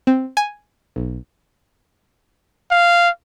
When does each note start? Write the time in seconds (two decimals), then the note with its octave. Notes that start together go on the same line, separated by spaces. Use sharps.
0.07 C4
0.37 G#5
0.96 B1
2.71 F5